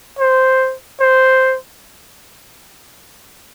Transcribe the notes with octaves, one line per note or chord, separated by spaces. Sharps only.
C5
C5